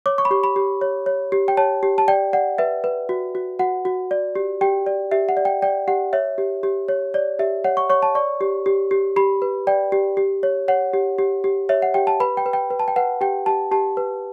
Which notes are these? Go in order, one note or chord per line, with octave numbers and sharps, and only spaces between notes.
C#5 D6
C#6
B5
G4 C#6
B5
G4
C#5
C#5
G4
G5
C#5 A5
G4
A5
D5 G5
D5 F#5
B4 E5
B4
F#4
F#4
F#4 F#5
F#4
D5
G4
G4 G5
D5
G4 E5
F#5
D5
G5
D5 G5
G4 F#5
C#5 E5
G4
G4
C#5
C#5 D5
G4 E5
C#5 F#5
C#6
C#5 C#6
A5
D5 C#6
G4
G4
G4
G4 B5
B4
D5 G5
G4
G4
C#5
C#5 F#5
G4
G4
G4
C#5 E5
F#5
G4 G5
A5
B4 B5
G5
B4
G5
B4
A5
G5
B4 F#5
G4 G5
G4 A5
G4 A5
B4